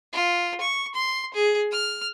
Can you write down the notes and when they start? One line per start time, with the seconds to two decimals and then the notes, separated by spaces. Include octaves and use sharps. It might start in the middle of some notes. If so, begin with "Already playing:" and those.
0.13 F4
0.61 C#6
0.95 C6
1.34 G#4
1.71 F6